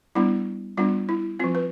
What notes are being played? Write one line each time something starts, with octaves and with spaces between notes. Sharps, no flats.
G3 B3 D4 E4
G3 B3 D4 F4
E4
F3 C4 F4
B4